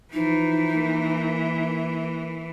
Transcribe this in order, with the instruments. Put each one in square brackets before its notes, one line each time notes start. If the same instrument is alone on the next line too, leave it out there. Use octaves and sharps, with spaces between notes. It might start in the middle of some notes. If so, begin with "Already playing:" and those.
[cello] E3 [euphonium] F3 [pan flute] D#4
[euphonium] A#3